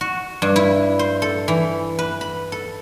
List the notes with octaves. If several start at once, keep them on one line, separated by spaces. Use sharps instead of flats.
F#4
G2
E4
C5
A4
E3
B4
B5
A4